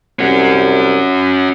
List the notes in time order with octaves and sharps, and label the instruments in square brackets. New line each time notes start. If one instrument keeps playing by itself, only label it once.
[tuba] C2 [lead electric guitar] C#4 F#4